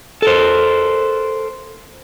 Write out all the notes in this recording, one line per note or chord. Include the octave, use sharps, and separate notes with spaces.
A4 A#4 C5